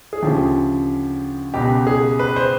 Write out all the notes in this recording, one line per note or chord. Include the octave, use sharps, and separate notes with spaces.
G#4
D2 C#3 F3 G4
C#2 B2 G4
G#4
B4
C5